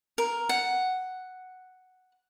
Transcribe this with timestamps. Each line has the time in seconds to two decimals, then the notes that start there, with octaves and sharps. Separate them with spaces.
0.18 A#4
0.49 F#5